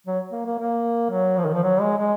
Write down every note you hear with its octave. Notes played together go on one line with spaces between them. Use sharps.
F#3
A#3
A#3
A#3
F#3
F3
D#3
F3
F#3
G#3
G#3